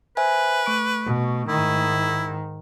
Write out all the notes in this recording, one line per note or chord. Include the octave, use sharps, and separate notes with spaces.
B4 C5 E5 G#5
A3 C#6 D7
B2
G#2 D#3 E4